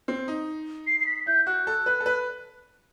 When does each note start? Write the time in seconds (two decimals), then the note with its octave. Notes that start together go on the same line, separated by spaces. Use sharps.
0.08 C4
0.28 D#4
0.87 C7
1.00 C7
1.06 B6
1.27 E4 G6
1.47 F#4 F#6
1.67 A4
1.86 B4
2.00 A4
2.06 B4